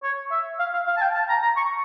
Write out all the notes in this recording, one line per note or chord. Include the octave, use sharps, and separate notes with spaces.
C#5
E5
F5
F5
F5
A5
G5
A5
A#5
A#5
C#6